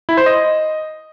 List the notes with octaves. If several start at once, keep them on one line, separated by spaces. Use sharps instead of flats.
E4
C5
D#5